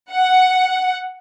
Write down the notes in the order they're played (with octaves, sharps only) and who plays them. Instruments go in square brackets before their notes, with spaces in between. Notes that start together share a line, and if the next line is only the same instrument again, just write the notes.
[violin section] F#5